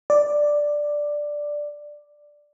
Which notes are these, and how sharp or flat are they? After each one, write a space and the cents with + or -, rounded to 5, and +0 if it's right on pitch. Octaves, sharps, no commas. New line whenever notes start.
D5 +5